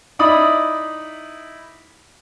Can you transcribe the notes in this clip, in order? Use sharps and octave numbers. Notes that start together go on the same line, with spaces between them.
D#4 E4 D5 D#5 B5 D#6